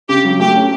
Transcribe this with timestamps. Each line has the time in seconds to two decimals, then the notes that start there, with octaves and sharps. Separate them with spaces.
0.09 C#3 G4
0.25 F#3
0.40 A3 G4
0.55 C#4